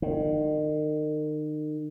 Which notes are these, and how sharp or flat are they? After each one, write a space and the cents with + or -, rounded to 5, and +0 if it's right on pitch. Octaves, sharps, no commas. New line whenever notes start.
D#3 -35